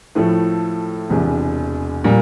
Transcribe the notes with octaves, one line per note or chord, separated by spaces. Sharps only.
A2 F3 A3 E4 A4
E1 E2 C3
A#2 G3